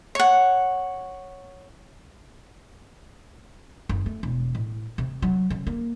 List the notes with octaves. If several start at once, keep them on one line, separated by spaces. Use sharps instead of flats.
C#5 F#5
F#1
A3
E1
A2
C3
F#3
C#3
A#3